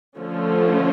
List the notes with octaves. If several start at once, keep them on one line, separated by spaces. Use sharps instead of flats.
D3 F3 A3 C#4